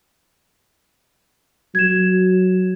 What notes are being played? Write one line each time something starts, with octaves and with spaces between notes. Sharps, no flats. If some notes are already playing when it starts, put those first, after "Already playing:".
F#3 G#6 E7